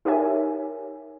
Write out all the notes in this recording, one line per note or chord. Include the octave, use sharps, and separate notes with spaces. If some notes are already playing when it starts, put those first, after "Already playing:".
D#4 G4 A#4 C#5 E5 G#5